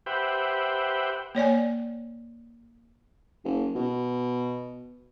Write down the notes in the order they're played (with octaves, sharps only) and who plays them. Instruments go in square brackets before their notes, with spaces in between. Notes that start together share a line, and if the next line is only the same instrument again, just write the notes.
[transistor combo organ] G4 B4 C5 E5 F#5 G5
[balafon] A#3 C#5 D5 G#5
[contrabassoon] F#1
B2